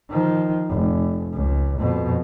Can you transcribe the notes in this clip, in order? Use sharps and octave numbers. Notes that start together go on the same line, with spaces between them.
D#3 F3
F1
C#2
F2 B2